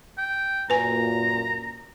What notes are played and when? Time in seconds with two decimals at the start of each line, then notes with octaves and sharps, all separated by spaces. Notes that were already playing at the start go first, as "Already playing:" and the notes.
0.18 G5
0.70 F#2 A#2 B4 G#5 A#5